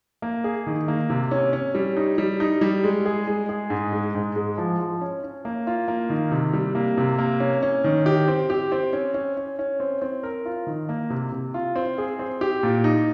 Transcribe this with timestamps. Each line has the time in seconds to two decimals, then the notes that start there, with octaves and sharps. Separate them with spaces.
0.22 A#3
0.44 G#4
0.67 D#3
0.88 A#3
1.10 C3
1.31 C#4
1.53 C#4
1.75 G3
1.97 D#4
2.18 G3
2.40 D#4
2.61 G3
2.84 G#3
3.06 G#4
3.28 G#3
3.49 G#4
3.70 G#2
3.93 G#3
4.15 G#2
4.36 G#3
4.58 F3
4.79 F3
5.01 C#4
5.23 C#4
5.45 A#3
5.67 F4
5.88 A#3
6.10 D#3
6.31 C3
6.53 G3
6.75 A#3
6.98 C3
7.18 A#3
7.40 C#4
7.63 C#4
7.84 D#3
8.06 G4
8.28 C4
8.50 G4
8.72 C4
8.93 C#4
9.14 C#4
9.37 C#4
9.59 C#4
9.80 C4
10.02 C4
10.23 A#4
10.45 F4
10.67 D#3
10.89 A#3
11.10 C3
11.32 C3
11.54 F4
11.76 C4
11.98 G#4
12.19 C4
12.41 G4
12.63 A#2
12.84 D#4